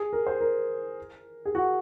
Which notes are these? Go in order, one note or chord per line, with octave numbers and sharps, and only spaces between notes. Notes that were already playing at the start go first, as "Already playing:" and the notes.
Already playing: G#4
A#4
C5
A#4
G#4
F#4